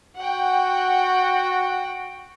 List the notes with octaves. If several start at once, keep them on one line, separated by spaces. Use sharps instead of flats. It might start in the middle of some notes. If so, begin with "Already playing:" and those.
F#4 F#5 G5